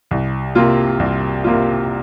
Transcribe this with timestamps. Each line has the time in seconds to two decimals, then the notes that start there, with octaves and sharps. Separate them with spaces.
0.11 C2
0.55 C3 A#3 F4
0.99 C2
1.44 C3 A#3 F4